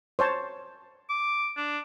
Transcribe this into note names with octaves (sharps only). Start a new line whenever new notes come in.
C5 C#5 A5
D6
D4